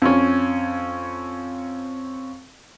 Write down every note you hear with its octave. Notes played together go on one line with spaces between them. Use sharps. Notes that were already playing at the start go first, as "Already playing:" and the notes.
F2 C#4